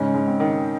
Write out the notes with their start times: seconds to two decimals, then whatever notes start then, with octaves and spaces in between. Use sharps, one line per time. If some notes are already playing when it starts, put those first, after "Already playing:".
Already playing: G#2 C#3 C#4
0.14 G#2
0.27 C4
0.40 D#3